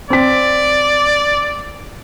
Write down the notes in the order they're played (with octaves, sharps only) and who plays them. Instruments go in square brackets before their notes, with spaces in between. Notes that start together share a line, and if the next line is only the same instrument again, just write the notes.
[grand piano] C4 B6 [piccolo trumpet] D5